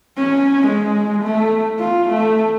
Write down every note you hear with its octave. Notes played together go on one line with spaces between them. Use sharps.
C#4
G#3
A3
F4
A3